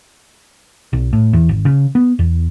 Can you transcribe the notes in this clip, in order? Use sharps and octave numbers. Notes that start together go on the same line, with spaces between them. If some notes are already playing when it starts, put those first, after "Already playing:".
B1
A2
E2
G#1
C#3
B3
E2